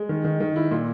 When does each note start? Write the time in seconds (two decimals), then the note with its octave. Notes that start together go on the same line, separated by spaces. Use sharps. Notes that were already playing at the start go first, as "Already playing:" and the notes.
Already playing: G#3
0.09 D#3
0.24 D#3
0.40 D#3
0.56 E4
0.71 A#2